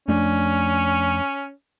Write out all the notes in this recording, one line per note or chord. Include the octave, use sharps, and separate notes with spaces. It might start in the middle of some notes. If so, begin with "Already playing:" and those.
F2 A3 C#4 D4